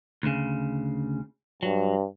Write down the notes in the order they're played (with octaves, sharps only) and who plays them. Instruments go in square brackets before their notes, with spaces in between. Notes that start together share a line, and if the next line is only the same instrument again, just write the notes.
[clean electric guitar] D2 C#3
[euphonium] G2 [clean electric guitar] F#3